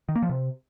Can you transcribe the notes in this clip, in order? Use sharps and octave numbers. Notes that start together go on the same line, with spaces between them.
D#3
A#3
F3
C3